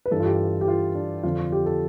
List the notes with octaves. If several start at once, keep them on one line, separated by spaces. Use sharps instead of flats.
B4
G2 E3 A4
F4
G4
G4
F4
D4
F2 D3 F3 F4
G4
A4